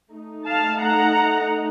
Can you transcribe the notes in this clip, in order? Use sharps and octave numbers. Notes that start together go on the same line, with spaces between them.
A3 D#4
F5 A5
F#5 A#5